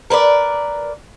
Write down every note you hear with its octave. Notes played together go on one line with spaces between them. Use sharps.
A#4 B4 C#5 D5